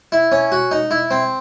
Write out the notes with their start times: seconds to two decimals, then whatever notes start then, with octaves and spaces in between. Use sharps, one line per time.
0.12 E4
0.32 C#4
0.52 F#4
0.71 D#4
0.91 E4
1.11 C4